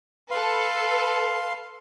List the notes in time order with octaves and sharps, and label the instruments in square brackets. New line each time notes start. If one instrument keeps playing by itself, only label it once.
[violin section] A4 B4 [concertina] F5 C6